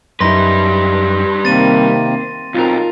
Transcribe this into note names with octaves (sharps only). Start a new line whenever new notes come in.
F#2 G3 D#4 E4 B4 C6 A#6
C3 D#3 A#3 C4 A6 D#7
B1 C4 F4 A#4